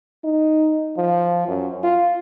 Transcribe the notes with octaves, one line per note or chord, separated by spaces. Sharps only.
D#4
F3
F#2
F4